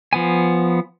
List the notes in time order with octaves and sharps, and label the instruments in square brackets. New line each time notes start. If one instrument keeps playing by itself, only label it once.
[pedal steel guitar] F3 B3 G#5